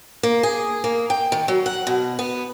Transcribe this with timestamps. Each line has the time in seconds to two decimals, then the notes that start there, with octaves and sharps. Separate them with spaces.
0.23 A#3
0.43 G#4
0.84 A#3
1.10 G5
1.32 D#3
1.48 F#3
1.66 F#5
1.87 B2
2.19 B3